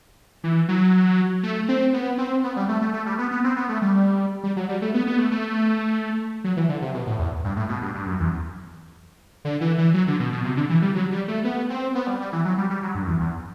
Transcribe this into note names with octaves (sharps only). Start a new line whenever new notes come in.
E3
F#3
A3
C4
B3
C4
B3
G3
A3
A3
A3
G3
B3
B3
C4
B3
A3
G3
G3
F#3
G3
A3
B3
B3
A3
A3
F#3
E3
D3
C3
B2
A2
E2
G2
A2
B2
G2
G2
F#2
E2
D3
E3
E3
F#3
D3
B2
B2
C3
D3
E3
G3
F#3
G3
A3
B3
C4
B3
G3
G3
E3
F#3
G3
G3
F#3
G2
F#2
E2
E2